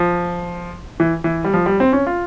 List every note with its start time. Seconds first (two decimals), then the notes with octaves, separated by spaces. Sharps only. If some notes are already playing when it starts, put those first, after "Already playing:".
Already playing: F3
1.00 E3
1.24 E3
1.44 G3
1.54 F3
1.66 G3
1.80 C4
1.93 C#4
2.07 F4